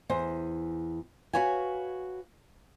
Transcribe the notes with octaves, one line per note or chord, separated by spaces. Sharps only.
E2 C5
F#4 A4 B4 C#5 F5 G#5